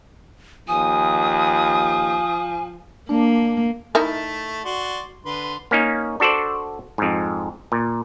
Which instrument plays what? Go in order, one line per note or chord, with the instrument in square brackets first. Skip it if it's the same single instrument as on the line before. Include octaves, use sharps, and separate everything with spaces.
[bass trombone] D#2 [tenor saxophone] F3 [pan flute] G#5 [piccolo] D#6
[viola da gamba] A#3 [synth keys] D4
[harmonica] A3 A5 [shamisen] D#4 E4 A#4
[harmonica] F#4 D5 C6
D3 B4 C6
[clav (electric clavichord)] A#3 C#4 D#4
D4 F#4 A4 C5 D5
F2 G#2
A#2